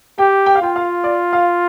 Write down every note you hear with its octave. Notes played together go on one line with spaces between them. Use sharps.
G4 G5
G5
F5
F4 G5
F5
D5
F5